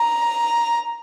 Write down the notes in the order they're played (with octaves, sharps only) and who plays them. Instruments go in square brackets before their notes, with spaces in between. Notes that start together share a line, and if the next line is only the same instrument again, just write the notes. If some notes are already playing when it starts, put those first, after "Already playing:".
Already playing: [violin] A#5